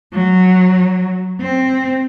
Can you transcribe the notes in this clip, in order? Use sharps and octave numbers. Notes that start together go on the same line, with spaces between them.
F#3
C4